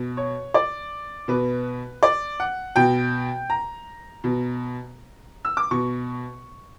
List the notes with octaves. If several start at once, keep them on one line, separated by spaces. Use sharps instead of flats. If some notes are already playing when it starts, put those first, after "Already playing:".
Already playing: B2
C#5
D5
B2 B4
D5
F#5
B2 G5
A#5
B2
E6
D6
B2 C#6